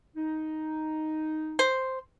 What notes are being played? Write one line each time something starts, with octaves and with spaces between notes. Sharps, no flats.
D#4
C5